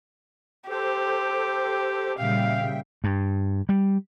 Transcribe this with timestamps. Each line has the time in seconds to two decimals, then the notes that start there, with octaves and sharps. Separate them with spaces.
0.70 G4 A4 C5
2.19 A#2 C#3 G3 E5 F5 G5
3.04 G2
3.69 G3